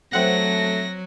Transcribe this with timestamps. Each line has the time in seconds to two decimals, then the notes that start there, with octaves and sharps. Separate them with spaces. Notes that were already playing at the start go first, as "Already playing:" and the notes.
0.13 F#3 A3 C4 F#5 A#6